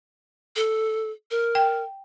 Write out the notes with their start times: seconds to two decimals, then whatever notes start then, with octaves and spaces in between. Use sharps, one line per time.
0.56 A4
1.31 A#4
1.55 G5